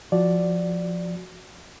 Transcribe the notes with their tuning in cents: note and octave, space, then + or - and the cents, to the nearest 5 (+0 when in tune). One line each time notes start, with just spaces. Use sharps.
F3 +0 F#4 +0 D5 +0